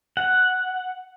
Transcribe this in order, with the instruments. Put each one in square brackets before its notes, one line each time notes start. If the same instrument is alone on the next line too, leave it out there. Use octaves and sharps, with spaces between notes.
[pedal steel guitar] F#5